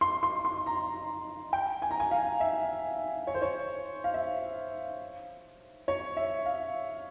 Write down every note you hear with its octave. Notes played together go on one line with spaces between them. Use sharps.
C6
C6
C6
A#5
G5
G#5
A#5
G#5
F5
E5
C#5
C5
C#5
F5
E5
C#5
E5
F5